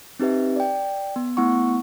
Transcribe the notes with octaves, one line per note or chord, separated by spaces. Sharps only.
C4 D#4 G4 B4 E5
D5 G5
B3
A3 B3 E4 F#5 C#6